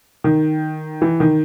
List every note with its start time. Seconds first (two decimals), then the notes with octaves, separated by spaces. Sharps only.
0.24 D#3
1.02 E3
1.20 D#3